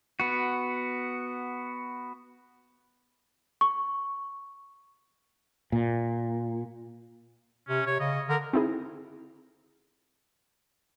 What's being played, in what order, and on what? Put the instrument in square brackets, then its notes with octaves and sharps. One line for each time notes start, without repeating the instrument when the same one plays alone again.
[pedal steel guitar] B3 F#4
[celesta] C#6
[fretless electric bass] A#2
[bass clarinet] C3 [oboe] C#4
[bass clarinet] C3 [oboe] C#5
[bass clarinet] C#3 [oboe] D#5
[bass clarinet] D3 [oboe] A#4
[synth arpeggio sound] C4 D#4 E4 G#4